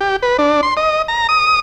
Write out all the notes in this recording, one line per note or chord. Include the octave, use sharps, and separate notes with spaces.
G4
B4
D4
C6
D#5
A#5
D#6